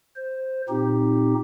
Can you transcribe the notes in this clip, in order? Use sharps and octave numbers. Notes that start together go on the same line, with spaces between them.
C5
A#2 C4 D#4 G4